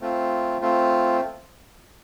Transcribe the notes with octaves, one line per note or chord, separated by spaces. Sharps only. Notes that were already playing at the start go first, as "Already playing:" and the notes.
A3 C4 F4
A3 C4 F4